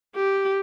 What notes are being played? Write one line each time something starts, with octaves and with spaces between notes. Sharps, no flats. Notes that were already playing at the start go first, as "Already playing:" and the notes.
G4